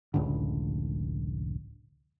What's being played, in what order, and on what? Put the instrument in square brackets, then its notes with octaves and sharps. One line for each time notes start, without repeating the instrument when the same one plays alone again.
[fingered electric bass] F1 C#2 A2 D3